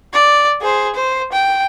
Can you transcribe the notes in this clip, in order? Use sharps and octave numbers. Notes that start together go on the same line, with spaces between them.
D5
G#4 C5
C5
G5